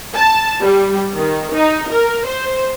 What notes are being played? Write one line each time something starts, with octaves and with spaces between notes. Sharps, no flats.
A5
G3
D#3
D#4
A#4
C5